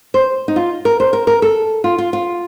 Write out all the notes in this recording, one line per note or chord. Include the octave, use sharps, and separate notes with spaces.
C5
D#4
F4
A#4
C5
A#4
A#4
A4
F4
F4
F4